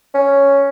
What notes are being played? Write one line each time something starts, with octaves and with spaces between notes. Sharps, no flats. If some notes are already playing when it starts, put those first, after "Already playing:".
C#4